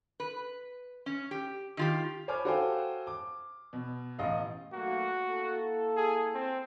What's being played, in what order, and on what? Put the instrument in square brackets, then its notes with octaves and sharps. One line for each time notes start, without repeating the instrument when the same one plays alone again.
[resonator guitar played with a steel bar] B4
C#4
G4
D#3 F4 G4
[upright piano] C5 C#5 G#5 B5 D6 F6
F#4 A4 C5 F5 G5 G#5
D6
B2
A1 D#5 F5
[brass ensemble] B1 A3 A#3 [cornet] F#4
[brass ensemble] A#3 E4 A4
[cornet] G#4
C4